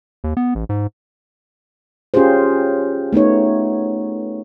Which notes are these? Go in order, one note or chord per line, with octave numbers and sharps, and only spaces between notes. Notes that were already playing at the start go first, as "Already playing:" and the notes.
D#2
B3
A1
G#2
C#4 F4 G4 G#4 C5
A3 B3 D#4 C#5